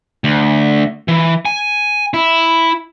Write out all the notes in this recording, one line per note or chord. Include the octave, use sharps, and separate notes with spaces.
D2
E3
G#5
E4